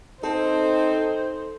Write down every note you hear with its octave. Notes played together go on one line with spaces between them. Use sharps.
C4 D#4 A4 C5